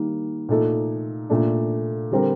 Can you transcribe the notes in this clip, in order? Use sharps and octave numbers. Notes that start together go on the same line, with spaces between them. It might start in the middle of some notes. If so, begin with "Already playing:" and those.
Already playing: D#3 G3 A#3 D#4
A#2 A3 D#4 A4
A#2 A3 D4
D3 G3 C4 G4 A#4